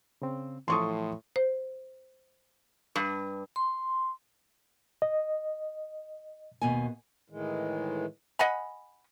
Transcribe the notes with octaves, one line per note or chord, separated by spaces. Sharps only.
C#3 C4
A2 E3 F3 A4 C6 C#6 D#6
C5
G2
C6
D#5
D#2 B2 G#5
A2 D#3 E3 G#3
D#5 F#5 G#5 B5